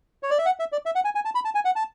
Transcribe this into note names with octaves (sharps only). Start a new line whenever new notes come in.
C#5
D5
E5
F#5
E5
D5
E5
F#5
G#5
G#5
A5
B5
A5
G#5
F#5
A5